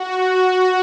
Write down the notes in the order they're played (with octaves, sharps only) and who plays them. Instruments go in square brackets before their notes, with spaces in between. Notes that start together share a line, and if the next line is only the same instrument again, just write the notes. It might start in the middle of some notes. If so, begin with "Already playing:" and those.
Already playing: [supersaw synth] F#4